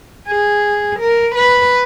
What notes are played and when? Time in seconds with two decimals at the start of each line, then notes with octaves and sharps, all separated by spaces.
0.28 G#4
0.99 A#4
1.35 B4